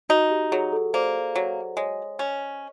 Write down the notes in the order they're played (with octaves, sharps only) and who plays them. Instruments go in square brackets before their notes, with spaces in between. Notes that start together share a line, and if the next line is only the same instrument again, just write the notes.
[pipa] D#4 [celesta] F#4
[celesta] G4
[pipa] F#3 [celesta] G#4
[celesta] A4
[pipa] A#3 [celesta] C5 D5
[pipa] F#3
[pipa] G#3 [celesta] C#5 D#5
[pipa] C#4